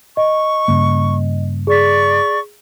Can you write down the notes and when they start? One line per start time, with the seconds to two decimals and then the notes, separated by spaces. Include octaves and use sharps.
0.17 D#5 C#6
0.68 G2 C#3 A#3
1.67 G#4 D5 C#6 B6